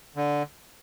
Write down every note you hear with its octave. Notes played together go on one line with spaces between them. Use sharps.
D3